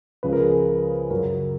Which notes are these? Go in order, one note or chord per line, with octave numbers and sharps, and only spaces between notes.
C#2 C#3 F3 B4
A#4
G#4
A#4
F#2 C#3 F#3 A#4